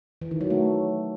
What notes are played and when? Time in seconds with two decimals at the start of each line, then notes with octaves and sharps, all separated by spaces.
0.22 E3
0.31 D#3
0.41 F#3
0.50 A3